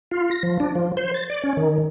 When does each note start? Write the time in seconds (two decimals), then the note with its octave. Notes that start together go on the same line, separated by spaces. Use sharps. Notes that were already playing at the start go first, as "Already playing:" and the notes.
0.11 F4
0.31 A#6
0.43 F3
0.60 D4
0.75 F3
0.97 C5
1.14 A6
1.30 D5
1.44 C#4
1.57 D#3